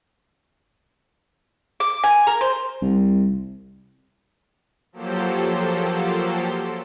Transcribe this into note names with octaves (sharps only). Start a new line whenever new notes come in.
D6
G#5
A#4
C5
C2
F3 F#3 A#3 G4 A4 C5